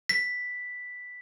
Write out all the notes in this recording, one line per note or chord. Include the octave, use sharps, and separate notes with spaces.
B6